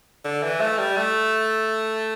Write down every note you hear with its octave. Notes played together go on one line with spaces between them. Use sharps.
D3
E3
A3
G3
A3